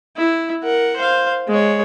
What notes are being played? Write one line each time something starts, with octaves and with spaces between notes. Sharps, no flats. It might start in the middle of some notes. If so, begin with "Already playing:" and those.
E4
A#4 F#5
C5 F5
G#3 C#5